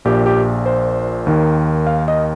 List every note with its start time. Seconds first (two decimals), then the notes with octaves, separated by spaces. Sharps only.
0.05 A#1 A#2 G4
0.26 G4
0.66 C5
1.27 D#2 D#3
1.87 F5
2.08 D#5